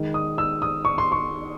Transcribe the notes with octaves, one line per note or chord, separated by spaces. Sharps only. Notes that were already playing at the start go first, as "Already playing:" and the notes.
Already playing: D#3 G#3
D#6
E6
D#6
C#6
C6
C#6